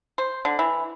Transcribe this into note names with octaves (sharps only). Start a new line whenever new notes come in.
C5
D3
E3